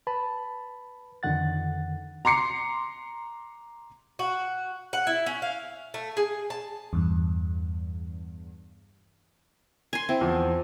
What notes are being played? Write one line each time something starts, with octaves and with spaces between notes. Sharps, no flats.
B4 A5 B5
F2 D3 D#3 F#5 A6
A#5 C6 D6 C7 C#7
F#4
F#5
E4
C#4
F5
A3
G#4
A5
E2 G2
G#5 C6
C4 E4
E2 F3